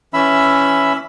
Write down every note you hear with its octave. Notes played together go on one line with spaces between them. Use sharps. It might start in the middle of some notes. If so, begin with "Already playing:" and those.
E3 C#4 E5 B5 E6